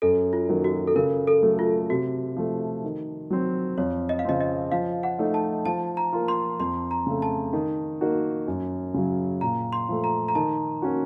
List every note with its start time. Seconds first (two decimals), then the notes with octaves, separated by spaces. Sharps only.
0.02 F#2 A4
0.33 F4
0.49 D#3 F#3 A#3
0.64 F#4
0.87 A4
0.96 C#3 A#4
1.27 A4
1.43 F#3 A3
1.59 F4
1.90 C3 F#4
2.37 F3 A3
2.84 D#3
3.30 F#3 C4
3.78 F2 C#5
4.09 D#5
4.19 F5
4.25 C#3 F3 C4 D#5
4.41 D#5
4.72 F3 F5
5.03 F#5
5.19 A3 D#4
5.34 A5
5.65 F3 A5
5.97 A#5
6.13 A#3 F4
6.28 C6
6.60 F2 C6
6.91 A#5
7.07 C#3 A3
7.22 A5
7.53 D#3
8.01 A#3 D#4 F#4
8.48 F#2
8.94 C#3 F#3
9.41 A#2 A#5
9.73 C6
9.89 F3 A3
10.04 A#5
10.28 A#5
10.35 D#3 A5
10.82 A#3 C#4 F#4